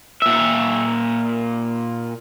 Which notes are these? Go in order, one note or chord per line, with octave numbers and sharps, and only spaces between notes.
A#2 E5